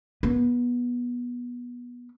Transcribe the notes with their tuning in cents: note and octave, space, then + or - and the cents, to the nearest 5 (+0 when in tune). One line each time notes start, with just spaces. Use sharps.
B3 -20